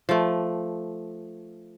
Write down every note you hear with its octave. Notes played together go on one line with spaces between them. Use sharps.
F3 A3